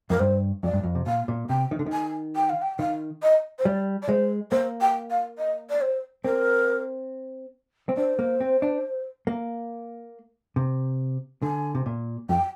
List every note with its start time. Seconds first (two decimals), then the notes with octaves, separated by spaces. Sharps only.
0.10 F2 A#4
0.20 G2 C5
0.63 F2 D5
0.73 G2
0.83 F2
0.95 C3
1.06 A#2 F5
1.28 A#2
1.49 C3 G5
1.71 D#3
1.79 D3
1.86 D#3
1.92 G#5
2.36 G5
2.50 F5
2.62 G5
2.79 D#3 F5
3.23 D#5
3.59 C5
3.65 G3 D5
4.02 D5
4.09 G#3 C5
4.51 A#3 C5
4.81 G5
5.10 F5
5.38 D#5
5.70 D5
5.81 C5
6.24 C4 A#4
7.89 C4
7.97 D4 C5
8.19 A#3
8.40 C4
8.62 D4
9.27 A#3
10.56 C3
11.42 D3 G#5
11.75 C3
11.86 A#2
12.29 F2 G5